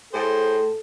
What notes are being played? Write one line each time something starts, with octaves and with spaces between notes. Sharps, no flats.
A2 G#4 A4 C5